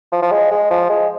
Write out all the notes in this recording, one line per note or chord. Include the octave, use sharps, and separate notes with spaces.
F3
F3
G#3
G#3
F3
G#3